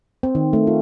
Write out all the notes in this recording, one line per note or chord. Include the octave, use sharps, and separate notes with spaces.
C4
D#3
A3
F4